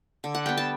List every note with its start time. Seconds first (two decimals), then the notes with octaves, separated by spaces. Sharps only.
0.24 D3
0.35 F#5
0.46 G3 B3 G5
0.57 A5